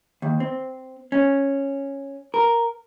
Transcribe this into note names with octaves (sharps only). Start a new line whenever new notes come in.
D#2
C4
C#4
A#4